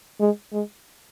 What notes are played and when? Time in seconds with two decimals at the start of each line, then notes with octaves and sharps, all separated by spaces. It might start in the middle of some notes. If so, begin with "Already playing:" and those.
0.20 G#3
0.52 G#3